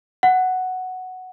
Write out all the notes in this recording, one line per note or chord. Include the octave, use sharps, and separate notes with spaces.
F#5